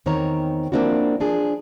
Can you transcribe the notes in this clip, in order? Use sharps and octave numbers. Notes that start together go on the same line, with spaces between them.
E2 D#3 C4 C#5 A#5
F3 A#3 C4 D4 E4 F#4
F3 D4 G#4